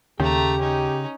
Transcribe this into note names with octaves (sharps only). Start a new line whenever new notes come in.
D#2 C#3 A3 G4 G5 A#5
C#4 D#4